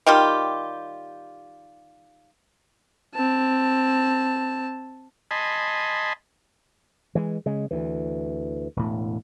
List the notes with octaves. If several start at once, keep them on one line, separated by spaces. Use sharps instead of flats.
D#3 G3 F4 G4
C4 A5
D#5 G#5 A5 B5 C6
E3 G#3
C#3 G#3
D2 E3
E1 A2